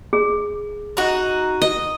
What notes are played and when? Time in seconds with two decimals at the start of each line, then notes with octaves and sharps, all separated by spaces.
0.13 G#4
0.97 D#4 F#4
1.62 D#5